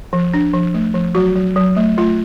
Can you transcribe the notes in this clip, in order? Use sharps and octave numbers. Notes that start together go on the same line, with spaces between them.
F3
D4
F3
A3
F3
F#3 F#4
F#3
F#3
A3
A3 F4